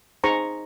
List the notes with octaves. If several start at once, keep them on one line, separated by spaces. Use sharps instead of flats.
D#4 G#4 C5 A#5 C#6